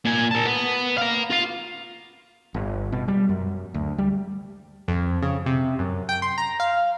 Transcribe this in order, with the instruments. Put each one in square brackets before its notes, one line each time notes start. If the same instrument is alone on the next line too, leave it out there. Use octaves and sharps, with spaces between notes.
[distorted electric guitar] A#2 G#5
A#4 A5
B3
F5 A#5
F4 F5
[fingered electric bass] G1
B2
G3
F#2
D2
G3
[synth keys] F2
C#3
C3
F#2
G5
C6
A#5
F5